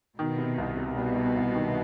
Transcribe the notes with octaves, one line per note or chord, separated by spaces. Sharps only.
B2 D#3
C3
C2
C3
B2 G3
G3
C2
D#3